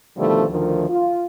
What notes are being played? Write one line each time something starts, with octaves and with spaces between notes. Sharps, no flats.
B2 D3 D#3 F3 G3 A3
D2 D#3 F3
F4